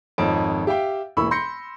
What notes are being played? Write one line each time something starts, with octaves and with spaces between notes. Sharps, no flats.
G#1 F2 D#4 C#5 A5 D7
G4 E5 F5 G5
E1 E3 A#3 B5 C#6 E6
B5 C6 G6 A#6 C#7